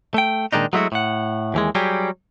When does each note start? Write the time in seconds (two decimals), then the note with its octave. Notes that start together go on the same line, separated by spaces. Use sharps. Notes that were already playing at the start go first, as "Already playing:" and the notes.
0.14 A3 G5
0.52 A#2 D#3 G#3 D4 D#4
0.73 F#3 G#3 A3 E4 F#4
0.92 A2 F#5
1.54 D#2 E3 G#3
1.75 F#3 G3 G4 G#4